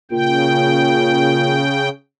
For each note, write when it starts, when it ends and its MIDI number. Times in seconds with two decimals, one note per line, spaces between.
0.11 1.66 46
0.11 1.89 49
0.11 1.89 79